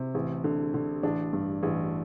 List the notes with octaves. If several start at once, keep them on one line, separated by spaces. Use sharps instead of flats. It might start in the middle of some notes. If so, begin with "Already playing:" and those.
Already playing: C3
A1
D3
D3
A1 D4
G2
A1